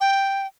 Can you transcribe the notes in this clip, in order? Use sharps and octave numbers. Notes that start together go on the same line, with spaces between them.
G5